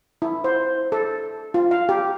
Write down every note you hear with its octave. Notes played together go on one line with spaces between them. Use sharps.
E4
C5
A4
F4
F5
G4